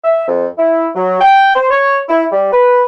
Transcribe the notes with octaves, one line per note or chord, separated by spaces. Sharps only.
E5
F2
E4
F#3
G5
C5
C#5
E4
G3
B4